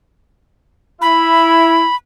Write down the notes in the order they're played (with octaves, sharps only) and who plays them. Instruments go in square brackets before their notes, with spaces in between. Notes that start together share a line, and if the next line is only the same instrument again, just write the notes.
[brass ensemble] E4 [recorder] B5